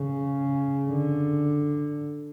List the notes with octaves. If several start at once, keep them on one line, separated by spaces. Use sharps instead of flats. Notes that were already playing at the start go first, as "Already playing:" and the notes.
Already playing: C#3
D3